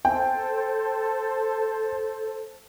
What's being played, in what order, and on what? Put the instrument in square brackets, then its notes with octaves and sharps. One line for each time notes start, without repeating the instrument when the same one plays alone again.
[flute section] A4 C5 [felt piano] G5